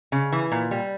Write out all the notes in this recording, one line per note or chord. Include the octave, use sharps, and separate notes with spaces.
C#3
E3
A#2
G3